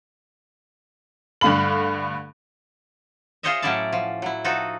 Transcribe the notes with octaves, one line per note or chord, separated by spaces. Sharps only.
G2 D3 A3 F5 B5 F#7
F4 G#4 C5 C#5 D#5 E5
A2 F#3 C#4 E4 D5 A5
F3
F#3 E4
F3 D#4 F#4 A4